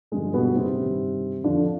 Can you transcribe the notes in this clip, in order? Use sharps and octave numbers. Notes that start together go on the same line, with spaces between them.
G2 D3 F3 G#3
B2 B3
C3 C4
G2 D#3
F2 D3 F3 D4